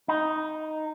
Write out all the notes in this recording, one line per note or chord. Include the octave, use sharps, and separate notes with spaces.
D#4